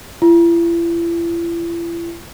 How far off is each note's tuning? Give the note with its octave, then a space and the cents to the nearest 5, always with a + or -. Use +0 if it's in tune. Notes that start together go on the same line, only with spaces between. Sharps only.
E4 +45